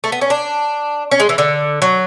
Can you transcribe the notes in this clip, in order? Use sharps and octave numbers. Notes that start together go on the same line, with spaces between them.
A3
B3
C#4
D4
C#4
G#3
E3
D3
F#3